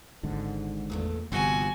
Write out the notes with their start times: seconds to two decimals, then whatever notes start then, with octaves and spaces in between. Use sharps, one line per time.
0.23 G#1 G#2 D3
0.90 E2 A#2 A3
1.32 G1 C3 F3 B3 F#4 G#5